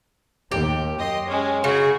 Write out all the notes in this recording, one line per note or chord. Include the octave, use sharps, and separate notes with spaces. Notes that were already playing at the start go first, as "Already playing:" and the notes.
D#2 G4
F#2 D#5 C6
G#3 C#4
C#3 F#4 G#4